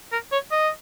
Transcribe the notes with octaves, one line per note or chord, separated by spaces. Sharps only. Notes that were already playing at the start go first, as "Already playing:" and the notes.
A#4
C#5
D#5